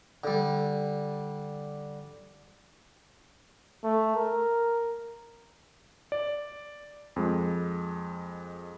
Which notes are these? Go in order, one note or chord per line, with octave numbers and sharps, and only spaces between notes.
D3 G3
A3
A#4
D5
F2 G#3